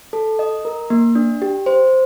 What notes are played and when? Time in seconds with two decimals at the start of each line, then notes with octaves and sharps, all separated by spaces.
0.13 A4
0.39 D#5
0.65 A#4
0.90 A#3
1.15 D4
1.42 G4
1.66 C5